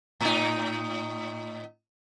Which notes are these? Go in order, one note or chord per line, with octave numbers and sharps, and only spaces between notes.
A2 D#4